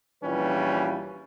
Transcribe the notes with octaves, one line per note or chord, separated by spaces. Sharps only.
A#1 E3 G3 C#4 F4 B4